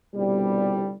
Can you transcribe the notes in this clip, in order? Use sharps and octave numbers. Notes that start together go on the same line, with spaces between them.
G1 C2 B2 D3 G3